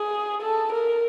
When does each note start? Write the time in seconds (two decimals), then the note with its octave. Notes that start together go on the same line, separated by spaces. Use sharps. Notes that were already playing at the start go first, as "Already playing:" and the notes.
Already playing: G#4
0.41 A4
0.72 A#4